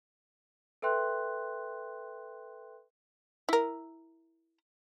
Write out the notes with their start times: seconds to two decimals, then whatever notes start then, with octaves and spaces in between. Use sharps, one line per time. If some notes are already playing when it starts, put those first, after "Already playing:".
0.82 A4 B4 E5 G5 C6 F#6
3.49 E4 A#4